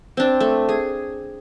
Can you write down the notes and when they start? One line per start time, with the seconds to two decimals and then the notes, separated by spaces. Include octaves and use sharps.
0.17 C4 D4
0.40 A3
0.69 G#4